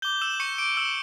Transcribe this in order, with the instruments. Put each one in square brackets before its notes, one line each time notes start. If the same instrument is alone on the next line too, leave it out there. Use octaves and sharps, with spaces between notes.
[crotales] D6 G6 G7
E6 E7
C#6 C#7
D6 D7
E6 E7